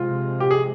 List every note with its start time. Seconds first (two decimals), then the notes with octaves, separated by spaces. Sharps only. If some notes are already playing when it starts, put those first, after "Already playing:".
Already playing: C3 F3 G#3 F4
0.40 G4
0.51 G#4